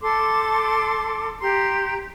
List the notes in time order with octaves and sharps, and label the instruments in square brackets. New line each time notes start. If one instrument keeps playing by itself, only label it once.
[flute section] A4 C6 D6
G4 A#5 C6